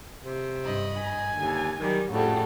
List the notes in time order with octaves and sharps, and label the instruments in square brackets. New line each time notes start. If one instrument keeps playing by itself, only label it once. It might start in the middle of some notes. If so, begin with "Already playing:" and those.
[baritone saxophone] C3
[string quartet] G2 D#5 B5
[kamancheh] G#5
[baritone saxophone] D#2 [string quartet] D3
[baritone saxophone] D#3 [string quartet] F#3 G3
[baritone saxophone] F2 [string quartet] A2 C#3 G3 [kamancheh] F#4 A4